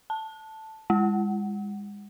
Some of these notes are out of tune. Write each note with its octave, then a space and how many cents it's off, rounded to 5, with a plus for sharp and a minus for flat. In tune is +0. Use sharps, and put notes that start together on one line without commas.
A5 +0
G#3 -30